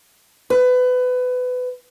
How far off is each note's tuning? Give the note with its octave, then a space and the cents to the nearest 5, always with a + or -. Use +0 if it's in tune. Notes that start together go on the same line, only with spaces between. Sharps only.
B4 +25